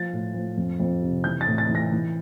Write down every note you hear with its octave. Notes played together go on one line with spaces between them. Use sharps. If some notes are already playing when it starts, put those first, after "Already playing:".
Already playing: F3 A6
A2
F3
F2
F2
C3
E3 G6
A6
A2
A6
E3
A#6
E3